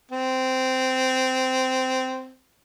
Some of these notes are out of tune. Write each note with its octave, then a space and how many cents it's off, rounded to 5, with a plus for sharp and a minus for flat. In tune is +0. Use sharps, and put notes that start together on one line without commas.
C4 -15